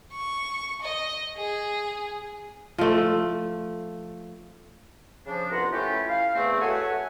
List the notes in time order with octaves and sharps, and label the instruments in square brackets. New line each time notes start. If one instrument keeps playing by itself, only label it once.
[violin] C#6
D#5
G#4
[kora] F3 A3
[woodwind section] C#3 F3 D4
C2 B3 F4 F#5 A#5
A3 C#4 E4 F4 G4
F5
E2 A3 C4
F#4 A4 C#5 E5 F#5 G#5